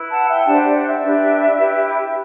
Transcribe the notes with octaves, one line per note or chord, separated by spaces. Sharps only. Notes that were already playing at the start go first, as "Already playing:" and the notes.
Already playing: E4 B4
F#5 A5
E5 G5
D4 G4 C5 F#5 A5
D5 F#5
D5 F#5
E5
D4 G4 B4
E4 G4 B4